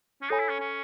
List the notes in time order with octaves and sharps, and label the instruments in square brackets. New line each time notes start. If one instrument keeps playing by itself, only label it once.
[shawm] C#4
[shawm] D#4 [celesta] A4 C#5 G#5 B5
[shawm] E4
C#4
C#4